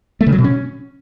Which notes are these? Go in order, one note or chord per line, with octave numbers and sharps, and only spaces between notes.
A3
C#3
F#3
B2
C#4